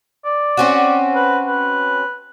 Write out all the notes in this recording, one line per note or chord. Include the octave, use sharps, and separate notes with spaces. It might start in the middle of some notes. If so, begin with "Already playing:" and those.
D5
C4 C#4 F#4
B4
B4